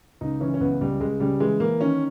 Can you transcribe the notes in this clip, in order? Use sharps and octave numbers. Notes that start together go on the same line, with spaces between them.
C#2 D#4
E3 C#4
C#4
C#2 B3
C#2 G3
C#2 G#3
C#3 G3
E3 G#3
E3 A#3
D#3 C#4